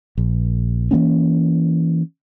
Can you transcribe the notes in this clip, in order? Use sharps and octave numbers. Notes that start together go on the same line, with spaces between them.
A#1
E3 F3 A#3 C#4